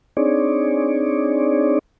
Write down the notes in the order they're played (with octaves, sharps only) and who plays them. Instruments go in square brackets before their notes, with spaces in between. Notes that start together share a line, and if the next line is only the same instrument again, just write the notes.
[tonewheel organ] C4 D4 D#4 G#4 C#5 D5